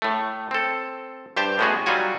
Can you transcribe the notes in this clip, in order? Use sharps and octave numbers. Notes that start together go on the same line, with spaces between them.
A2 A3
C4 A4
G2 G4 C5 G5 A5
A2 G#3 B3 C#4 F#4 G#4
F#3 G3 D#4 F4 F#4 G#5